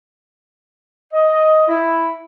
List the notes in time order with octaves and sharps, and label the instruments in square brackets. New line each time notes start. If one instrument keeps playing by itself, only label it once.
[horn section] D#5
E4